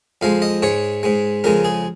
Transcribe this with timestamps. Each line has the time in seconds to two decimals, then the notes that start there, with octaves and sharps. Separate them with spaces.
0.21 F2 F3 G#3 F5
0.42 D#5
0.62 G#2 G#3 C#5
1.03 G#2 G#3
1.44 F2 C#3 G#3 A#4
1.65 G#4